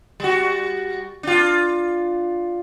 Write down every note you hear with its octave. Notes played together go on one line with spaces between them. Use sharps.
G3 F#4
D4 F4